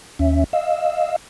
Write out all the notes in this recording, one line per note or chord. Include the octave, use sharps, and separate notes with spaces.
D#2 C#4 E5
D#5 F5 E6